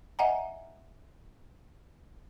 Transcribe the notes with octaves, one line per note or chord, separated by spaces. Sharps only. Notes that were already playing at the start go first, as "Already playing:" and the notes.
D#5 E5 F#5 G#5 A#5